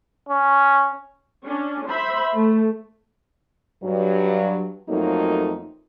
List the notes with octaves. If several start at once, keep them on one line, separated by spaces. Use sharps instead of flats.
C#4
C#4 D4
C5 E5 B5
A3
G2 F#3
F2 F#3 A3 A#3 D#4